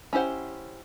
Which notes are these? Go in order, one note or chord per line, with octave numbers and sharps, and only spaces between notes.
C#4 E4 G4 C5 F#5